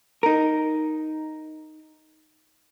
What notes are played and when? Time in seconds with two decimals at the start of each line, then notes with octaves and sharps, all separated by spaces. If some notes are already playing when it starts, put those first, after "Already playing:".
0.23 D#4 A#4